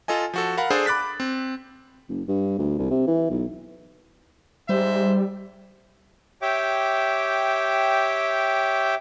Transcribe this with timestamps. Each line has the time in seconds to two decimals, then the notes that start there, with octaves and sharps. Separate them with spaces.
0.08 F4 A4 D#5 G#5
0.33 F3 F#4 A4
0.57 A#4 F5 F#5 B5
0.70 D4 G#4 A4 C5
0.86 B5 D6 F#6 A6 B6
1.20 C4
2.09 F#1
2.28 G2
2.58 D2
2.78 C2
2.90 C3
3.07 E3
3.30 B1
4.69 G#2 G3 C5 E5
6.42 G4 C#5 E5 G5 D6